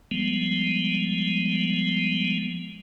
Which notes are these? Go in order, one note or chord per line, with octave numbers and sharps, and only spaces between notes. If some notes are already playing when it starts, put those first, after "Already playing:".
F3 G3 G#3 B3